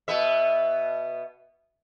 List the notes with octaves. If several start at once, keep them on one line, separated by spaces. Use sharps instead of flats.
B2 B3 E5